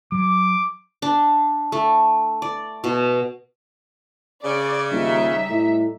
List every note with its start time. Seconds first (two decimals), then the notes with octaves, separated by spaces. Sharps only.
0.12 F#3 D6
1.02 D4
1.72 A3
2.42 D5
2.84 B2
4.44 C#3 D5
4.92 D#1 G3 D#4 E5
5.50 A2